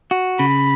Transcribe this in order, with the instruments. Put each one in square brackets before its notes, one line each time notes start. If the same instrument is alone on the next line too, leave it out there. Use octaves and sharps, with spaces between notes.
[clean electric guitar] F#4
[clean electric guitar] C#3 [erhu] B5